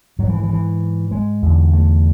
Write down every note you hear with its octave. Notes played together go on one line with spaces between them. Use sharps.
G#2 F#3
E3
E3
E3
G#3
E2 D3
A3